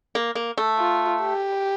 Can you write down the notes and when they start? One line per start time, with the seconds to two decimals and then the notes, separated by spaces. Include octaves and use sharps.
0.15 A#3
0.35 A#3
0.58 A3
0.79 F4
1.22 G4